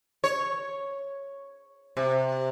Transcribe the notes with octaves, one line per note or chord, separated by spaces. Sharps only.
C#5
C3